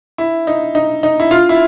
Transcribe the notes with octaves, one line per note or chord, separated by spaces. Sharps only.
E4
D#4
D#4
D#4
E4
F4
E4